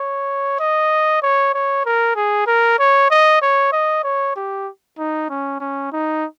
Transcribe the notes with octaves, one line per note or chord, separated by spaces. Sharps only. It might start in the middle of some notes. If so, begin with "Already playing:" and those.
Already playing: C#5
D#5
C#5
C#5
A#4
G#4
A#4
C#5
D#5
C#5
D#5
C#5
G4
D#4
C#4
C#4
D#4